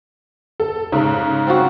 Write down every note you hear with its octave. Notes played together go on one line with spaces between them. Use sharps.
A4
G#2 C#3
C4 F4 F#4